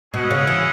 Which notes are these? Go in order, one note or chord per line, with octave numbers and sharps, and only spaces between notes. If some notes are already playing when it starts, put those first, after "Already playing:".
B2 C#4 E4 G#4 D#5 F#5
C#3
E3